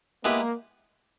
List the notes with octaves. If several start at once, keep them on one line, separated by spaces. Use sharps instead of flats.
G#3 A#3 B3 E4 G4 B4